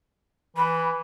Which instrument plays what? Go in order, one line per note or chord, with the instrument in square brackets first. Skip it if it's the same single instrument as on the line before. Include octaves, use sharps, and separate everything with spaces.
[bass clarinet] E3 [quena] B5